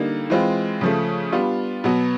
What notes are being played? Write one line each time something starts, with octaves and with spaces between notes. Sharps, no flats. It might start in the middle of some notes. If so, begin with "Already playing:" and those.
Already playing: D3 G3 A#3 D#4
E3 G#3 C4 F4
C#3 F3 A3
G3 B3 D4 F4
B2 F#3 B3